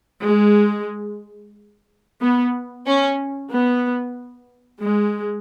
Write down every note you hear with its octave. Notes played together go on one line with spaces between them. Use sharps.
G#3
B3
C#4
B3
G#3